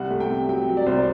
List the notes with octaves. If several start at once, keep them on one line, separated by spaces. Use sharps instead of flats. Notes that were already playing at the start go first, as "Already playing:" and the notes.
Already playing: C2 G3 F#5
A3
G5
C3
F#3 G5
F#3
D5
C2 C5
D5